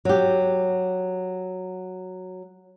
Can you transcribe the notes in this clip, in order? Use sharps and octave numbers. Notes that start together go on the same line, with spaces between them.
F#3 G4